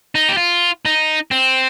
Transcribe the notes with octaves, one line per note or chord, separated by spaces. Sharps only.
D#4
G4
F4
D#4
C4